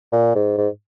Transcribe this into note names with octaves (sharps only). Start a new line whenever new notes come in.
A#2
G#2
G#2